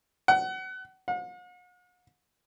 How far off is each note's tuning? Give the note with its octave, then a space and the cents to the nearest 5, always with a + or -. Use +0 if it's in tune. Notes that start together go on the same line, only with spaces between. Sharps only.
F#5 +30
F#5 -45